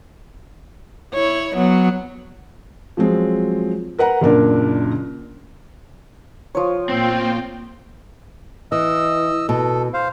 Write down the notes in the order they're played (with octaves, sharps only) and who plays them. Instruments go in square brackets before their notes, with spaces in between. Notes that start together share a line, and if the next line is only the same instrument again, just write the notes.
[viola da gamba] E4 C#5
F#3 B3
[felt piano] F3 F#3 G#3 C4
A#4 B4 F#5 A#5
F#1 A#2 D4 A#4
[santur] F3 C#5
[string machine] A#2 F4 [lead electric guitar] C4 [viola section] G5
[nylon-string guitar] E3 [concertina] D#5 E6
[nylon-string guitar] B2 [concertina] A4
[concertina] C5 F5